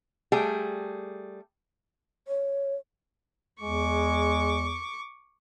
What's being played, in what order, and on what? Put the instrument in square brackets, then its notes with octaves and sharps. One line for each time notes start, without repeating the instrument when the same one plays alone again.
[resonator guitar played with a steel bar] G3 A3 G#4 G5
[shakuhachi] C#5
[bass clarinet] E2 [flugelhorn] G#3 [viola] C#6 D6